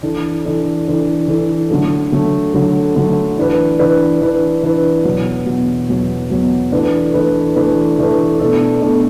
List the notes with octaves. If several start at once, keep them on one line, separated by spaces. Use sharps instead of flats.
E3 D4 A4
E3 D4 A4
E3 D4 A4
E3 D4 A4
D3 F#3 A3
D3 F#3 A3
D3 F#3 A3
D3 F#3 A3
E3 D4 B4
E3 D4 B4
E3 D4 B4
E3 D4 B4
E2 B2 F#3
E2 B2 F#3
E2 B2 F#3
E2 B2 F#3
E3 A3 D4 B4
E3 A3 D4 B4
E3 A3 D4 B4
E3 A3 D4 B4
B2 A3 D4 A4
B2 A3 D4 A4